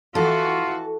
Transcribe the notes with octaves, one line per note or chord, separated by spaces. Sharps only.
E3 F4 F#4 A4